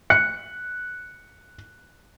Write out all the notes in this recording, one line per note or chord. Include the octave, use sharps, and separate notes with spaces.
F#6 C#7